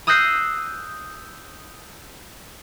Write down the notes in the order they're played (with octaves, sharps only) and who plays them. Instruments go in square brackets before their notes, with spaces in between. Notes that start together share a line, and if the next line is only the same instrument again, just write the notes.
[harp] D#6 E6 F#6 G6 A#6 C7